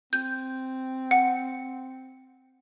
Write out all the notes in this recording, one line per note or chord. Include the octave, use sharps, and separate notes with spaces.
C4 G6
F#5